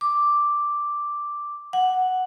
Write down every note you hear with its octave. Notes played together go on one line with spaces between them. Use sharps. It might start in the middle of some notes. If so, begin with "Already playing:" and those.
D6
F#5